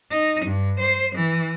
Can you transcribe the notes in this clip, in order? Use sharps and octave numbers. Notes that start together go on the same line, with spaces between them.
D#4
G2
C5
E3